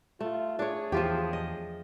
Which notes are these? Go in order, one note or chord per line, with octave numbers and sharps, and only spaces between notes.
A3 F4
D4 G#4 C#5
E2 F3 F4 G4
D#5